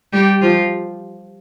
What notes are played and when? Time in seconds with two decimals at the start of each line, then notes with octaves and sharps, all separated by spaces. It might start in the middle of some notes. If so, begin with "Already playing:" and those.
0.13 G3 G4
0.41 F3 F4